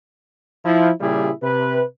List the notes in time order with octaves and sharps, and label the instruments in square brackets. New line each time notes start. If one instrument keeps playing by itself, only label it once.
[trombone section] F3 E4
A#2 C#3 G3 E4 G4 G#4
C3 B4